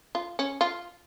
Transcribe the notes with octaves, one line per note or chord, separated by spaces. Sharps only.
F4
C#4
F4